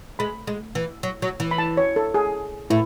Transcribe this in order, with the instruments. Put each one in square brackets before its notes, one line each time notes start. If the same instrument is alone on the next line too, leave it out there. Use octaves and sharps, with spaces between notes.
[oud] G#3 [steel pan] B5
[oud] G#3
E3
F#3
F#3
E3
[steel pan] B5
A5
C#5
A4
G#4
[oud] A2 [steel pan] E4